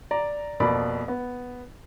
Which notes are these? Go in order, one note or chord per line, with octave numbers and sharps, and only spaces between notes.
D5 A#5
F2 B2 A#3 D5 B5
B3